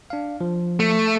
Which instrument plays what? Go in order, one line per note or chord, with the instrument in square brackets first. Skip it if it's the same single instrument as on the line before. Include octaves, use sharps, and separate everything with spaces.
[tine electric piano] D4 F5
F3
[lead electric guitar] A3